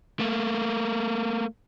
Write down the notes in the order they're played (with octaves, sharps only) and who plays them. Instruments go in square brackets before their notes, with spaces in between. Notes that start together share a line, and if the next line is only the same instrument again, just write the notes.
[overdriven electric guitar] A3 A#3